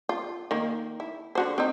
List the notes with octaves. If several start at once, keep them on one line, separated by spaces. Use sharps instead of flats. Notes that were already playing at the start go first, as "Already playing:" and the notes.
F4
D#3 A#3
E4
D3 F#4 C5
C4 D#4